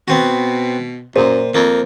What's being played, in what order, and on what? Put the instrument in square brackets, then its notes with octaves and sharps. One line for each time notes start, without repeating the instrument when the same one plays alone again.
[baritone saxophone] B2 [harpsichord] B3 C4 F#4
[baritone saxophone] F#2 [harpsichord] A#2 [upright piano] C5
[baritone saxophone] F2 [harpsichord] A#3